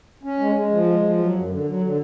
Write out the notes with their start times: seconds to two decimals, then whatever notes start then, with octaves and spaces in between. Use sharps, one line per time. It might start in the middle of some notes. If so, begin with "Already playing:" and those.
0.23 C#4
0.39 G#3
0.55 G#3
0.71 F3
0.87 G#3
1.03 F3
1.18 F#3
1.34 F#2
1.50 D3
1.66 F#3
1.81 D3